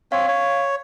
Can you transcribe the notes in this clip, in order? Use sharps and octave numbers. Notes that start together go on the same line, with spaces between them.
C4 C#5 F5
C#5